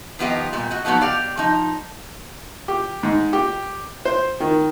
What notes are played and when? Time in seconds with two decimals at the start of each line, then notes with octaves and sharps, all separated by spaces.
0.19 D#3 F3 B3 F4 G4 D#5
0.53 A#2 G3
0.71 F#4 D#5
0.85 F3 F#3 B3 D#4 F#4
1.01 G4 D5 F5
1.37 F3 D#4
2.68 G4
3.03 G#2
3.33 G4
4.05 C5
4.40 D#3